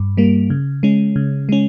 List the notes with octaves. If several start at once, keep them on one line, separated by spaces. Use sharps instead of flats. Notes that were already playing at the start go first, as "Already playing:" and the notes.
Already playing: G2
G3 A#3
C#3
G#3 C#4
C#3
G#3 C#4